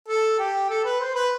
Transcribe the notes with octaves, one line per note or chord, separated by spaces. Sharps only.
A4
G4
A4
B4
C5
B4